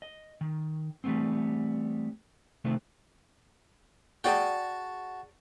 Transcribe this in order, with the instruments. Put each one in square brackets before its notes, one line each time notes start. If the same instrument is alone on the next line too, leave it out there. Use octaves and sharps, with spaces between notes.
[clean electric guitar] D#5
D#3
E3 G3 A3 B3 C4
C3 D#3 A3 B3 C4 F4
[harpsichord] F#4 A5 [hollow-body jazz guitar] G#4 D5 G5